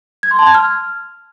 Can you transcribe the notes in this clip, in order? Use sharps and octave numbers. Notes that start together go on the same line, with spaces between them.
G#6
C6
A5
G#6
F6